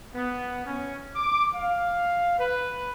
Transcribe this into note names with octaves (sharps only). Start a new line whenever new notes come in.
B3
C#4
D6
F5
B4